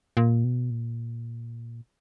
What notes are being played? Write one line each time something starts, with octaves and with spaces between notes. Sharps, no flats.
A#2
B2
A#2